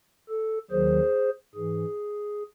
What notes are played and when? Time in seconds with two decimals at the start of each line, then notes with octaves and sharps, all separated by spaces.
0.29 A4
0.71 D#2 D#3 F#3 G#4 C5
1.55 G#2 E3 G#4